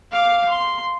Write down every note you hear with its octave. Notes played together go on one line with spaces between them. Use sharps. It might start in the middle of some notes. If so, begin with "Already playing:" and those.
F5 D6
C6